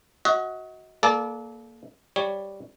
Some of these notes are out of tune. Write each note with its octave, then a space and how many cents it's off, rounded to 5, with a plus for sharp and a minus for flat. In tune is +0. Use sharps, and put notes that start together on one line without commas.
F#4 +0 D#5 +35
A#3 +0 A4 -35 D5 +0
G3 +0 C#5 +0